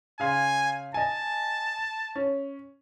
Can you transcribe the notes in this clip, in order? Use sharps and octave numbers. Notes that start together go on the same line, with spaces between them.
C#3 F5 G#5 C6
D#5 G#5 A5
C#4